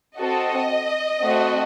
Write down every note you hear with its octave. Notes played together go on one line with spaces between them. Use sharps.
C4 F#4 A4 D#5
A3 C4 F#4 A4